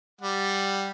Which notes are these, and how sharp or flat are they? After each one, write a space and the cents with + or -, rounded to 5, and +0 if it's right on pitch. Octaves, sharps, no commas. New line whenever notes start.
G3 +0 F#5 +0